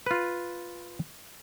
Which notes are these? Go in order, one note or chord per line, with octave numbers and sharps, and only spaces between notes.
F4 B4